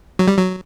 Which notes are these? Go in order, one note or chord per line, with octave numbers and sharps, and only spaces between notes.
F#3
G3
F#3